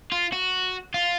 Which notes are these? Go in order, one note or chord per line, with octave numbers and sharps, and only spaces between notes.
F4
F#4
F4